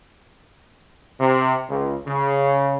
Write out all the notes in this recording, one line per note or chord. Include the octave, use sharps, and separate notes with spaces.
C3
C#2
C#3